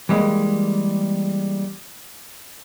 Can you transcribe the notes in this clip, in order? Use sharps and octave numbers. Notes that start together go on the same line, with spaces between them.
E3 G3 G#3 A#3